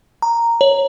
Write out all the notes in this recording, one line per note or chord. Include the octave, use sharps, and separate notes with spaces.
A#5
C#5